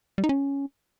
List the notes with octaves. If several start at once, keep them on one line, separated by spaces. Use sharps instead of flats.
G3
D#4
C#4